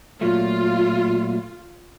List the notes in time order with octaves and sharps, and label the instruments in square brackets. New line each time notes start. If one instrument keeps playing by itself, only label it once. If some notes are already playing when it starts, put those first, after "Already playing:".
[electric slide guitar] A#2 F#3 A3 [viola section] F4